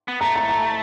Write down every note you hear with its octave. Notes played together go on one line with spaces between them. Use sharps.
B3
A3 A#5
A#5
A#5